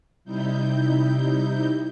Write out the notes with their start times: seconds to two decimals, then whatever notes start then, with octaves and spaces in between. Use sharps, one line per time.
0.25 C3 G3 D#4 E4 G6